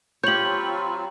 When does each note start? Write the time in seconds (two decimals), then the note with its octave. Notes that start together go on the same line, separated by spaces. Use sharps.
0.24 F4 G4 C#5 B5 C#6 G6 F#7
0.43 F#3 C4